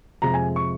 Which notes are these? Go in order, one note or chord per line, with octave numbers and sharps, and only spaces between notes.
F2 C3 F3 G#3 A#5
G#5
C#6